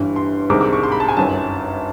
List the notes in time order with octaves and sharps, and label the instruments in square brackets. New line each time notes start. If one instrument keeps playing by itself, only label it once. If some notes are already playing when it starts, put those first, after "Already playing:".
Already playing: [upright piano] G1 G2 E3 G3
C6
C2 C3 D#3 G#3 D6
D6
C#6
C6
B5
A5
G#5
G1 F#2 D#3 F#3 A5